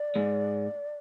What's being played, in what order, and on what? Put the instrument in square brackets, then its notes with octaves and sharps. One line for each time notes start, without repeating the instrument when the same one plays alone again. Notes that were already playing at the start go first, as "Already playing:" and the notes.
Already playing: [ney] D5
[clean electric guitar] G#2 G#3